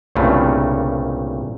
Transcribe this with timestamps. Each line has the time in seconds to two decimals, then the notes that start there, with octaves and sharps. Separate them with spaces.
0.15 C2 G2 A#2 C#3 A3